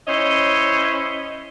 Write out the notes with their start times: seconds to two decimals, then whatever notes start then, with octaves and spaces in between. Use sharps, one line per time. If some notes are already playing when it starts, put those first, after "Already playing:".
0.08 C#4 E4 C5 C#5 D#5